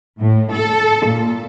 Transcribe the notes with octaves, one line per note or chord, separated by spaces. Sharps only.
A2
A4
A#2